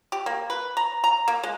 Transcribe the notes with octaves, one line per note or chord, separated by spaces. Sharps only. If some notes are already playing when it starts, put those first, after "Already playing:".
G4
A#3
B4
A#5
A#5
A#3
G#3